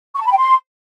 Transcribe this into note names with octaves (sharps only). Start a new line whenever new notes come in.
C#6
A5
B5
G5
C6